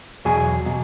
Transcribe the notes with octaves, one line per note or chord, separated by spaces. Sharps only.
E2 B2 F#3 G#4
B2 F#3